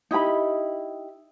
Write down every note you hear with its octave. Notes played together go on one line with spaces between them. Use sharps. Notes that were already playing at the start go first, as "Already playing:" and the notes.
D#4 E4 G4 B5